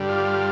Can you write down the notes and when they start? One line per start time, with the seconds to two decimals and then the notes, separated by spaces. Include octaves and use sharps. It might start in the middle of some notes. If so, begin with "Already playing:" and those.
Already playing: G2 D3 G3
0.09 F4